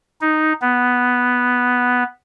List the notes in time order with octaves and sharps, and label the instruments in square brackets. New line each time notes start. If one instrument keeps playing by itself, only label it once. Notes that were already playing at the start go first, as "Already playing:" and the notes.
[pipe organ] D#4
B3